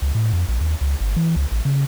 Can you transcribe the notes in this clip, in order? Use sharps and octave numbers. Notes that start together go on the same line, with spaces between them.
C#2
A2
F2
A#1
D#2
C#2
G1
E3
C#2
A1
C#3